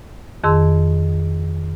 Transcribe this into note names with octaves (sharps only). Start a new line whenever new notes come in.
F2 D#3 G#4 C6 E6